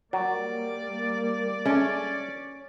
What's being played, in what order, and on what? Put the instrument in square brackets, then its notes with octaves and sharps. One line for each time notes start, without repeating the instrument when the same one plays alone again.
[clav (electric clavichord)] F#3 [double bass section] G3 A#3 [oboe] D5
[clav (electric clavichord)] G#3 A3 [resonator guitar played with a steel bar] C#4